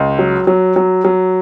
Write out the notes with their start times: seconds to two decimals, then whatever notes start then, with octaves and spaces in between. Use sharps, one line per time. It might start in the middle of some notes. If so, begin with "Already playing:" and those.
Already playing: C#2
0.19 F#3
0.47 F#3
0.76 F#3
1.05 F#3